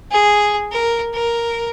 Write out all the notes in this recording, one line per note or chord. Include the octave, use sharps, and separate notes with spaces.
G#4
A#4
A#4